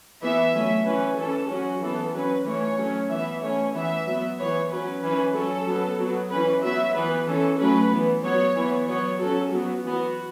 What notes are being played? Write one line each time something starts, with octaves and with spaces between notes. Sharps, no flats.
E3 B3 E5
F#3 A3 C#4
E3 C#4 B4
E3 C#4 A4
F#3 C#4 F#4
E3 B3 A4
F#3 C#4 B4
E3 A3 C#4 C#5
F#3 A3 C#4
E3 B3 E5
E3 A3 C#4 C#5
E3 B3 E5
F#3 B3
E3 B3 C#5
F#3 C#4 B4
E3 C#4 B4
F#3 C#4 A4
F#3 B3
F#3 B3
E3 C#4 B4
F#3 B3 E5
E3 B3 B4
E3 C#4 A4
F#3 A3 C#4 B4
E3 B3
F#3 B3 C#5
E3 B3
F#3 B3 C#5
F#3 C#4 A4
F#3 B3 F#4
E3 B3 F#4